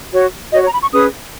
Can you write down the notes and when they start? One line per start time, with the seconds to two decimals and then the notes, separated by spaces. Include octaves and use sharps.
0.13 F#4 C#5
0.52 F#4 C#5 D#5
0.63 C#5
0.68 A#5
0.72 B5
0.82 C#6
0.92 C#4 G#4 B4 D#6